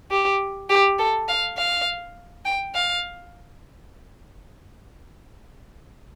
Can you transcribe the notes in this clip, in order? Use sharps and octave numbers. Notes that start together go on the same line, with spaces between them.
G4
G4
A4
F5
F5
G5
F5